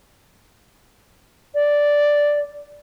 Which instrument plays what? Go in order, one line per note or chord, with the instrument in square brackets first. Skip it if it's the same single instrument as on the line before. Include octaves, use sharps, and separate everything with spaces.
[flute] D5